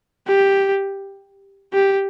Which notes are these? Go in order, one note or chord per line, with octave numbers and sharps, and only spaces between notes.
G4
G4